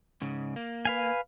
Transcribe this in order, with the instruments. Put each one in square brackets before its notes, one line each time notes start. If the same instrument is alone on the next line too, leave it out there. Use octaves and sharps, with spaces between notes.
[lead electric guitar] G#2 C#3
A#3
[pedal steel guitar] B4 F5 G#5